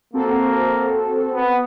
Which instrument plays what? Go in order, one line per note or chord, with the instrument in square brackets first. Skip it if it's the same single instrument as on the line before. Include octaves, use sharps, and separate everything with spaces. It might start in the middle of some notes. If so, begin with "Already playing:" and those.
[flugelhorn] A#3 [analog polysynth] C4 F#4 A4
[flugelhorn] B3